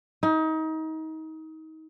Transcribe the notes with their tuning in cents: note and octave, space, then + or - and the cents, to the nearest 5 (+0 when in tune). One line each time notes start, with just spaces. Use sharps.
D#4 +30